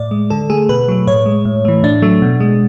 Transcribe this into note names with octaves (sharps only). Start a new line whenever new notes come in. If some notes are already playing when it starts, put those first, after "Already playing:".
Already playing: A2 D5
G#3
D3 A4
A3 G#4
B2 B4
F#3 A3
A2 C#5
G#3
A2
E3 A3
A2 D4
F#3 A3
B2
G#3